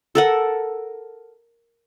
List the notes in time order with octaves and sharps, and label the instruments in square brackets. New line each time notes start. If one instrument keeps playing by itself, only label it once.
[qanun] A4 A#4 F#5